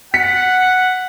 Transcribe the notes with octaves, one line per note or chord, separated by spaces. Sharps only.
F#5 B6 C#7